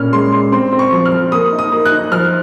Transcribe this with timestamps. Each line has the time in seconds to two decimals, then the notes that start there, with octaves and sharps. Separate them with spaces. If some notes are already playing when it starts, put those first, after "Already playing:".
Already playing: A#2 C#4 F6
0.13 G#3 C6
0.32 G#3 C6
0.52 C4 C6
0.72 C4
0.79 C#6
0.92 F3
1.06 F6
1.12 F3
1.32 A#3 D#6
1.52 D#4
1.59 D#6
1.72 A#3
1.85 F#6
1.92 D#4
2.11 F3 F6